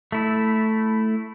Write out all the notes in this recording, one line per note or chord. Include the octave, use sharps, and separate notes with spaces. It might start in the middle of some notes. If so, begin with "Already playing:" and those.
A3 E4